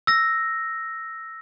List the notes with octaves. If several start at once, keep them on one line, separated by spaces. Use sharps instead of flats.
E6 A#6